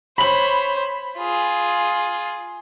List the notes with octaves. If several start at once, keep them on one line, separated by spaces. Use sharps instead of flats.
C5 C#5 B5 F#7
F4 G#4